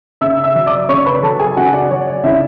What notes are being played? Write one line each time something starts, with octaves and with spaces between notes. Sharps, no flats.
C#3 E5 E6
E5 E6
F#3
D5 D6
C#3 C#5 C#6
B4 B5
F#3 A4 A5
G#4 G#5
C#3 F#4 F#5
D5
F#3 C#5
D5
C#3 E4 E5